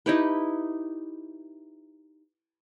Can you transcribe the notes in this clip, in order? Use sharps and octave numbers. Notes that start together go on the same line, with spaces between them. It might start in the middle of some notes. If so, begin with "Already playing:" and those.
D#4 E4 G4 B4